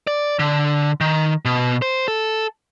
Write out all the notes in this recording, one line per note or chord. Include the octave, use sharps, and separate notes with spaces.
D5
D3
D#3
B2
C5
A4